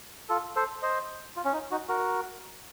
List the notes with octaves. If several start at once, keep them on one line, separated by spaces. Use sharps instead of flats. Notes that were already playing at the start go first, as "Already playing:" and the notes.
F4 A4
A4 C5
C5 D#5
F4
C#4
D#4
D#4 F#4
F#4 A#4